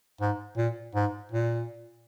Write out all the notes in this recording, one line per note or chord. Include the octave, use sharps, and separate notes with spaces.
G#2
A#2
G#2
A#2